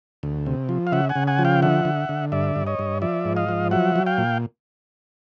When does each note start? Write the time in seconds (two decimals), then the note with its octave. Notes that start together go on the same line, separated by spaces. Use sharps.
0.23 D2
0.46 C3
0.69 F3
0.87 F5
0.92 C#3 E5 F#5
1.09 F#5 G#5
1.16 C#3
1.27 F#5 G#5
1.39 F3
1.45 F5 G5
1.62 D3 E5 F#5
1.85 D3
2.09 D3
2.32 G2 D5 E5
2.56 G2
2.67 C#5 D#5
2.79 G2
3.02 F3 D5 E5
3.25 G#2
3.37 D#5 F5
3.49 F3
3.71 F#3 E5 F#5
3.96 F#3
4.06 F5 G5
4.18 A#2